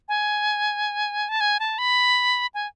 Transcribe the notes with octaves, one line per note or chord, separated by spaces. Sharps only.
G#5
A5
G#5
A5
B5
G#5